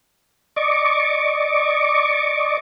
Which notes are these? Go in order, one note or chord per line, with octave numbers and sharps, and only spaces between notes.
D5 D#5 C#6 D6